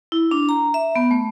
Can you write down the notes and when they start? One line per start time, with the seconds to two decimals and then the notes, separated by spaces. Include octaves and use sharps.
0.12 E4
0.31 D4
0.49 A#5
0.74 E5
0.96 B3
1.11 A3